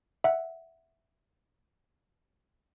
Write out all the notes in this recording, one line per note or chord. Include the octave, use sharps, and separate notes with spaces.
E5 F#5